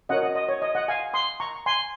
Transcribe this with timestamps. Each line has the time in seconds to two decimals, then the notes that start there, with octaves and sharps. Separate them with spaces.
0.09 C#4 F#4 A#4 C#5 D#5 F#5
0.23 D#5
0.35 D#5
0.48 C#5
0.62 D#5
0.75 D#5 F#5
0.88 F5 G#5
1.13 C6 D#6
1.40 A#5 C#6
1.66 G#5 C6